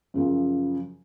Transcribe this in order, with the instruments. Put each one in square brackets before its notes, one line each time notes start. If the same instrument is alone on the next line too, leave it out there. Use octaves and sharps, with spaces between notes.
[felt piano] F#2 C#3 F3